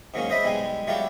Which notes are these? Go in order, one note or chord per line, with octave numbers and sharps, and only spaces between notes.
G#2 F#3 A#3 C#4
C5 D#5 E5 B5
B1 G3 G#3 G#5
F#3 E4 F4 G4 A4 D5